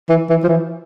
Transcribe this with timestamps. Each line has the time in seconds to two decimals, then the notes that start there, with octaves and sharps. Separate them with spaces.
0.09 E3
0.29 E3
0.43 F3
0.48 E3